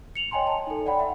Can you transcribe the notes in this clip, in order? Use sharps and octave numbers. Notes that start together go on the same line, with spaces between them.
C#7 F7 F#7
C#5 D#5 G5 G#5 A#5 C6
A5
D#4 A4
D5 F#5 G5 B5
E5 F#5